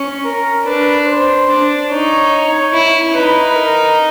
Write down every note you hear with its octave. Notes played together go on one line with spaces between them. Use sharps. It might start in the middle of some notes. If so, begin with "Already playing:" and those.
Already playing: C#4
A#4
D4 B4
C5
D4
D#4 C#5
E4
D#4 B4
A#4